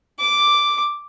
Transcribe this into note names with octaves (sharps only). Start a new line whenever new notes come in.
D6